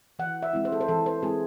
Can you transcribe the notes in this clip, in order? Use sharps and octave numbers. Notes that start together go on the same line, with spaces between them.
E3 F#5
E5
G#3 C4 E4
C5
A4
C5
E3 A4
C5
G#3 C4 E4 G#4